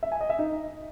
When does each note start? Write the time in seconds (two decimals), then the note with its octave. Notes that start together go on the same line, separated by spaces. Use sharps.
0.03 E5
0.12 G#5
0.21 D#5
0.30 E5
0.39 D#4